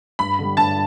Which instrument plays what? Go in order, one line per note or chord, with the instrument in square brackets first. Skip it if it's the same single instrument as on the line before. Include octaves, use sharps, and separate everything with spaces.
[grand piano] G2 [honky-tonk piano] B5
[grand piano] D3 G3
[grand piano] G2 [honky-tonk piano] A5